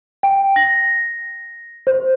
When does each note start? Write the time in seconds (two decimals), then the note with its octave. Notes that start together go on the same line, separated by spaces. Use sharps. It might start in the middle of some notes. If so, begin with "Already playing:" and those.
0.23 G5
0.56 A#6
1.87 C5